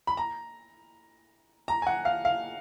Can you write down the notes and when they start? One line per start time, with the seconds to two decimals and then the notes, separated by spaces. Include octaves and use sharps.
0.07 B5
0.17 A#5
1.68 A#5
1.82 G#5
1.87 F#5
2.05 F5
2.25 F5